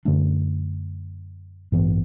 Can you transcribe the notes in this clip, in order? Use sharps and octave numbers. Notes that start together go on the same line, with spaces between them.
F#2 D3 A3 D4
A1 G2 E3 B3